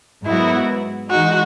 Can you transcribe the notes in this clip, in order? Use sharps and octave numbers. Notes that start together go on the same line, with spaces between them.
G#2 F#3 B3 E4 F#4 A#4
E3 G#3 D#4 F#4